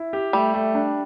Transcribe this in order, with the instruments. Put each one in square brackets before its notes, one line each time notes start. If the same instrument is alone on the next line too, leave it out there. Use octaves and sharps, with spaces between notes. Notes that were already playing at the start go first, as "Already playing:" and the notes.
Already playing: [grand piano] E4
G4
[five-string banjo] G3 [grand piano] A3
[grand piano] A3
D4